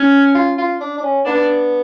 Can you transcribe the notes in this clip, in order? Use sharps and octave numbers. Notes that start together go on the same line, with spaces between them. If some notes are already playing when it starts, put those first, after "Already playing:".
Already playing: C#4
F4
F4
D4
D4
C#4
B3 D4